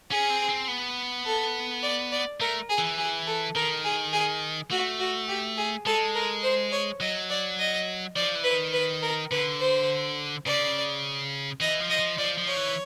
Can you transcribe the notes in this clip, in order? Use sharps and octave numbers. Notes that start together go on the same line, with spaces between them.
C#4 G#4
C4
C4
B3
A4
D5
D5
A3 A#4
G#4
E3
G#4
A4
D#3 A#4
G#4
G#4
A3 F#4
F#4
G4
G#4
G#3 A4
A#4
C5
C#5
F#3 D#5
D5
D#5
F3 D5
E3
B4
D#3
B4
A#4
D3 B4
C5
C#3 D5
E3 D#5
F3
D#5
F3
F3 D5
F3
C#5
E3